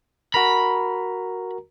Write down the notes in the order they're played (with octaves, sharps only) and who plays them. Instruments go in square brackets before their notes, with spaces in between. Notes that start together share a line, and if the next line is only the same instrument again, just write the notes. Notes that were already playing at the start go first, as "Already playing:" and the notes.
[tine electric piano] F#4 A#4 A#5 [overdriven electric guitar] B5